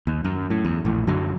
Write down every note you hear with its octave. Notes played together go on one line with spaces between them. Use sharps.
D#2
F#2
A2
E2
A#1 A2
F#2 D3 F#3